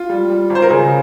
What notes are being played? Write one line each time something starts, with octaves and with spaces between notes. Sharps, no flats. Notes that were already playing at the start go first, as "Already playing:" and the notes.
Already playing: F4
G3
G3
G#1
C5
A#4
C#3 G#4